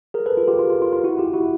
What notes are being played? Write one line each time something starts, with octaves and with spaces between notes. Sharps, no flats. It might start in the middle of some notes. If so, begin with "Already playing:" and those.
G#4 A#4
A4 B4
F4
F4 G4
F4
F4
F4
F4
E4 F#4
F4 G4
E4 F#4